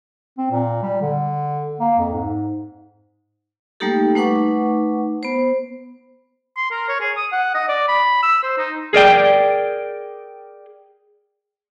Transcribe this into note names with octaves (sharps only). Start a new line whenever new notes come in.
C4
A#2
G3
D3
A#3
F2
G#2
G3 A3 A#3 D#4 G4 A4
A3 D#4 B4 F#5 C#6 D6
B3 C5
C6
A#4
C#5
G#4
D#6
F#5
D#5
D5
B5
E6
C5
D#4
G#4 A#4 D5 G5